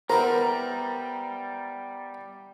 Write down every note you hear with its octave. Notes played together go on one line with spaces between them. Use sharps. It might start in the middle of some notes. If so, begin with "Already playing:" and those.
G3 B3 E4 A#4 C5 A#5